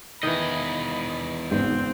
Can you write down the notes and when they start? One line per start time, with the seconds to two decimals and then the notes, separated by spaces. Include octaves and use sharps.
0.23 E2 D#3 E3 D#5 B5
1.51 G#1 C#3 B3 C4